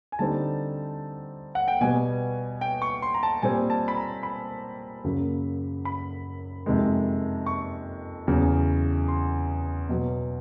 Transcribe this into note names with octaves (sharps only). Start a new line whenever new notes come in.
G#5
D3 G3 C4 D#4 A5
F#5
G5
B2 G3 B3 G#5
G5
C#6
C6
A#5
A5
A#2 G3 C4 G#5
A5
B5
A#5
B5
F#2 C#3 F#3 A#3
B5
F2 C3 D#3 G#3
C#6
E2 C#3 F#3
C6
B2 F#3 B3